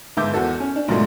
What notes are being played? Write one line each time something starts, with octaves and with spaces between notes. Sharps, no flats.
G1 G#2 E5 D6 G6
E2 F#4 A4
C#4
D4
B1 G#2 F3 F#3 G#3 A3